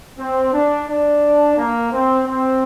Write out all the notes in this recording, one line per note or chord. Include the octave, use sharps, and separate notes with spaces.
C4
D4
D4
A#3
C4
C4